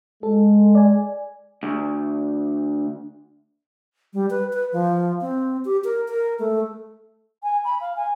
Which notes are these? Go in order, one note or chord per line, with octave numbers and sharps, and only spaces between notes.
G#3 A4
D5 G#5
D2
G3
B4
B4
F3
C4
G4
A#4
A#4
A3
G#5
B5
F5
G#5